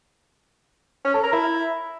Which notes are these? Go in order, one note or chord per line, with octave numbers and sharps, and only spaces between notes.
C#4
A4
A#4
E4